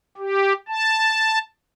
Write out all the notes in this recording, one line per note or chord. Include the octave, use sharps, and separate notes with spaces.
G4
A5